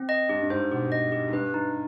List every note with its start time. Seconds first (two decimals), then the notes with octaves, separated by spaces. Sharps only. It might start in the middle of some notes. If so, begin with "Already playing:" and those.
Already playing: C4
0.09 D#5
0.29 G2 G4
0.42 G2
0.50 G#2 C5
0.71 B2 G4
0.92 D#5
1.12 G4
1.28 G#2
1.33 G2 B4
1.54 D#4